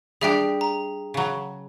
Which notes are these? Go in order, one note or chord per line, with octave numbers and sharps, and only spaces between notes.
G3 D4 G4 G#4 E5 G5
A#5
C#3 F#3